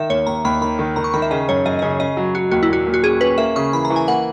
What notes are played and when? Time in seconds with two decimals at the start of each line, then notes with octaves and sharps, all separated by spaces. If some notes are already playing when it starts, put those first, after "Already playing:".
Already playing: D#3 E5
0.10 D#2 C#5
0.27 D#2 A#5
0.45 D#2 B5
0.61 D#3 B5
0.79 D#3
0.96 D#3 A#5
1.04 C#6
1.14 D#3 B5
1.22 E5
1.31 C#3 D#5
1.49 F#2 C#5
1.65 F#2 D#5
1.79 D#5
1.82 C#3 C#5
2.00 C#3 D#5
2.17 F#3
2.35 F#3 F#4
2.51 D#2 F#4
2.63 E4
2.69 A#2 F#4
2.87 A#2
2.94 F#4
3.03 C#4 G#4
3.21 C#4 B4
3.38 A#3 E5
3.56 C#3 C#6
3.73 E3 B5
3.85 A#5
3.90 E3
3.96 G#5
4.08 A#3 F#5